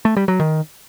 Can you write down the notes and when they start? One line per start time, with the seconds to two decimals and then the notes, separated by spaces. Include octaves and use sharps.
0.05 A3
0.17 G3
0.28 F#3
0.40 D#3